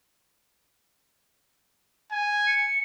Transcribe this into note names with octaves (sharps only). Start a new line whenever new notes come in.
G#5
C#7